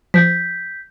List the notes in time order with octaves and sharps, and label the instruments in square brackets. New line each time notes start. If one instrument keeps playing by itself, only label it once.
[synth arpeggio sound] F3 [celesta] G6 B6